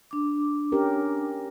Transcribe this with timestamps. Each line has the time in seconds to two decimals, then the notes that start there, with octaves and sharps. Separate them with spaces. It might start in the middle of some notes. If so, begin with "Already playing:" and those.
0.11 D4 D6
0.72 C#4 G4 A#4